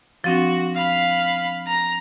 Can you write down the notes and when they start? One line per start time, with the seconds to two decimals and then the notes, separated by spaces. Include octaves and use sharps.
0.24 F3 C4 D4 F#4
0.75 F5 B5
1.66 A#5